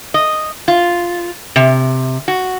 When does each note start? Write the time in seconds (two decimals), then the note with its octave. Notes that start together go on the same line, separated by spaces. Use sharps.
0.14 D#5
0.68 F4
1.56 C3
2.28 F#4